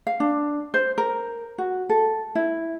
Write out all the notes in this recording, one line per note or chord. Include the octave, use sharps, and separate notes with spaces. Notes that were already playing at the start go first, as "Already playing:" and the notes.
F5
D4
C5
A#4
F#4
A4
E4